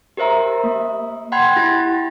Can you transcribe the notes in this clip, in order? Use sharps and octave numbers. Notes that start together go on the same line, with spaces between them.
G4 A#4 C5 E5 A#5
A#3
F#5 G5 B5 C6 G#6
E4 G4 A6